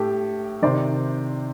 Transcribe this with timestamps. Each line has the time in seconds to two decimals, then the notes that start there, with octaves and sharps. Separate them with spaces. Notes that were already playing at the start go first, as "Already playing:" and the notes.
Already playing: A2 G4 A4
0.62 C3 D#3 C5 D5